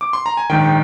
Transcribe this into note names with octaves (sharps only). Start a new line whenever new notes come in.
D6
C6
A#5
G#5
A#1 G#2 D#3 G5